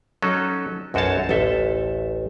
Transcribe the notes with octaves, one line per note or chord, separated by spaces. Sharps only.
F#3 C#4 D#4 A4
B1 F#2 F#4 C5 C#5 A5
A1 D2 A4 E5